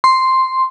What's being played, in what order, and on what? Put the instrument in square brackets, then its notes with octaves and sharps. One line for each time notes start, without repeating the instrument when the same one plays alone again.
[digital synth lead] C6